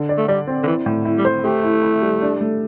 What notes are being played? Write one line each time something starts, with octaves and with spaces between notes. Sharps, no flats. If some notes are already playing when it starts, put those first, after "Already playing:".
Already playing: D3
D5
A3
G3 D5
C4
D3
E3 E4
A2
E4
G3
C5
A3 G4
E4
E4
G3
D4
A3